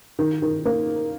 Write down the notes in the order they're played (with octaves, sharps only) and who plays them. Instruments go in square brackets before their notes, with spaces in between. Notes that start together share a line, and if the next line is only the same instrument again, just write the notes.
[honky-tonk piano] D#3
D#3
A#3